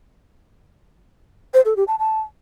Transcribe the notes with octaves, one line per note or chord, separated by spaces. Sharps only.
C5
A4
G4
A5
A5